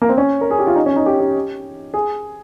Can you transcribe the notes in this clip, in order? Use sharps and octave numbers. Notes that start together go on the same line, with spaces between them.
A#3
C4
C#4
A#4
G#4
G4
F4
D#4
C#4
D#4
G4
G4
G#4